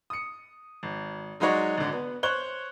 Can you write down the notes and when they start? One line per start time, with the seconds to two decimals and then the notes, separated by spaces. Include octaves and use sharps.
0.10 D#6 C#7
0.83 G#1
1.40 F#3 G#3 D#4 F#4 C#5 D5
1.78 G#1 D3
1.92 B3
2.23 C5 C#5 F#6 G7